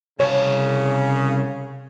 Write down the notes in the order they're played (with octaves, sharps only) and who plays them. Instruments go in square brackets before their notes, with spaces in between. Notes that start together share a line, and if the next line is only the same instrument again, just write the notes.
[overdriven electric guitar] C2 A5 [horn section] C#3 [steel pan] C#5